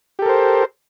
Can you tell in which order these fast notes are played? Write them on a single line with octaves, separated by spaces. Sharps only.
G4 A4 A#4 C5